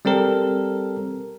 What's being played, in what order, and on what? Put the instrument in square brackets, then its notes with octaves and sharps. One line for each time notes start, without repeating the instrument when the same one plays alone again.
[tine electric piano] G3 C4 A4 A#4